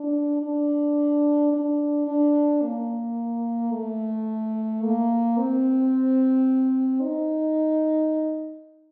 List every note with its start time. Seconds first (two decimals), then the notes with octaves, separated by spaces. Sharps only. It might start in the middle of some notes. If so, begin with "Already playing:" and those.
Already playing: D4
0.42 D4
1.53 D4
2.07 D4
2.62 A#3
3.72 A3
4.82 A#3
5.37 C4
7.01 D#4